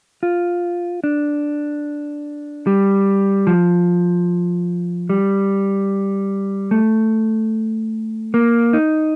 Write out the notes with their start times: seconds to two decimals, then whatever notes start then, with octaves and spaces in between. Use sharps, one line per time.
0.23 F4
1.04 D4
2.67 G3
3.47 F3
5.10 G3
6.71 A3
8.34 A#3
8.73 D#4